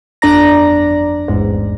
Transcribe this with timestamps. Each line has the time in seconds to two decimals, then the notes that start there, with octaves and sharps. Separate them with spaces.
0.22 G1 F2 D4 D5 A#5 A#6
1.28 A1 E2 G#2